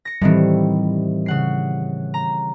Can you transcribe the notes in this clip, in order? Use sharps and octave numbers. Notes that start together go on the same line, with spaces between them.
A#6 C#7
A2 D#3 E3 G3 C4
C#3 F#5 C7
A#5